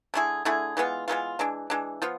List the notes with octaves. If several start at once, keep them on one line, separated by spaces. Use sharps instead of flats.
D3 A3 E4 G#4
D3 A3 E4 G#4
E3 G#3 B3 F4
E3 G#3 B3 F4
E3 G#3 D4
E3 G#3 D4
F3 B3 F4